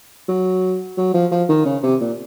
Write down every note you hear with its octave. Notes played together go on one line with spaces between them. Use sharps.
F#3
F#3
F3
F3
D#3
C#3
C3
A#2